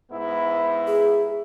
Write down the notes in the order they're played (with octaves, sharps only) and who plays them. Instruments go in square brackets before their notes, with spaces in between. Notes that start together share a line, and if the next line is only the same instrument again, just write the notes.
[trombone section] G#2 B3 E4
[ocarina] G#4